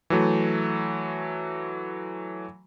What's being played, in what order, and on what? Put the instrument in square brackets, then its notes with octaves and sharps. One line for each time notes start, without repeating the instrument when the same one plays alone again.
[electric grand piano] E3 F#3 A3